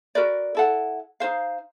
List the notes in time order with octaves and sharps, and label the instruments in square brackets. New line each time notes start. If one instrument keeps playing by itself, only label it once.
[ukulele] F#4 A#4 B4 D5
E4 A4 F#5
D#4 F4 C5 F5